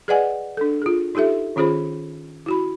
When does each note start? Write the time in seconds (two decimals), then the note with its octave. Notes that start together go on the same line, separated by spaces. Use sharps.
0.08 G#4 B4 D5 D#5 F#5 G#5
0.57 D4 A4
0.82 F4 G#4
1.15 D#4 F4 G4 A4 E5
1.56 D#3 C#4 F4 G#4 C5 B5
2.46 E4 F#4 B5